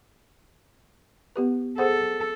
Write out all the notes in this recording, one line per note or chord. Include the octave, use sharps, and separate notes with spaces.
B3 G4 B4
G#4 A4 C5 F#5